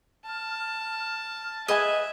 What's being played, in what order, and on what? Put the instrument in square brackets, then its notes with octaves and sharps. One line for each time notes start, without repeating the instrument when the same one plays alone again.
[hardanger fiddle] A5 [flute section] F6
[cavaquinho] G#4 B4 G#5 [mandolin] D#5 [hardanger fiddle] E5